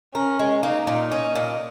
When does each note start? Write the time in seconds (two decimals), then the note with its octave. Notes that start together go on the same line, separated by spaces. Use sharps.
0.14 C#4 A#4
0.39 G#3
0.63 A#3 D#4
0.87 A#2
1.11 C#4 D#5
1.35 A#2